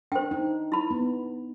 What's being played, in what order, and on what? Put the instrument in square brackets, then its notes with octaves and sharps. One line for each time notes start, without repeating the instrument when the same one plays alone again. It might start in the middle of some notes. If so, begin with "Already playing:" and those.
[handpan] D4 [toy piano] C5 G5
[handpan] D#4
[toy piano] E4 B5
[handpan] B3